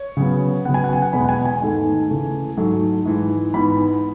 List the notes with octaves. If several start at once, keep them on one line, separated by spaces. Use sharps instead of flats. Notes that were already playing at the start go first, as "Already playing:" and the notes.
Already playing: C#5
C#3 F#3 B3
C#3 F#3 B3 F#5
G#5
F#5
G#5
F#5
E2 B2 G#3 B3 B5
F#5
G#5
G#5
G#2 D#3 A3
C#3 E3 A3
G#2 F#3 A3
G#2 E3 G#3
G#2 E3 B3 B5